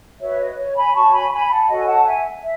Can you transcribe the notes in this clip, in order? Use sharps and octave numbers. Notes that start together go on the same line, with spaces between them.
F#4 B4 C#5 E5
D#5
C#5
G#5 B5
F#4 C#5 A5 C#6
G#5 B5
G#5 B5
F#5 A5
F#4 A4 C#5 D#5 F#5
G#5
F#5 A5
E5 G#5
E5